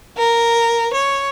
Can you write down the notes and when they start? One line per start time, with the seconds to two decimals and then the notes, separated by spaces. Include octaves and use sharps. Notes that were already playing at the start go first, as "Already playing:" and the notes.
0.18 A#4
0.94 C#5